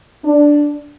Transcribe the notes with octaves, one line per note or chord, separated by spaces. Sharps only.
D4